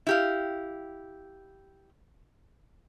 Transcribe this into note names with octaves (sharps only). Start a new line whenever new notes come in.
E4 G4 F5